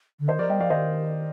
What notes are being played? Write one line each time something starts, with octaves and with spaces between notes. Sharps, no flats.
D3
D#3 C5 D#5
F3 A#4 D5
G3 D#5 G5
F3 D5 F5
D#3 C5 D#5